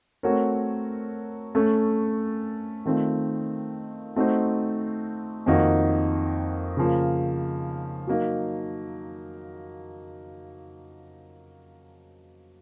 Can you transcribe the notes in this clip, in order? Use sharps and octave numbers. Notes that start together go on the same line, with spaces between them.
A3 C4 F#4 A#4 C#5
A3 C#4 A4
D#3 A3 C4 F4
A3 C4 D#4 F#4 C5
F2 D#3 A#3 D#4 F#4
C#3 F3 A#3
F#3 A#3 D#4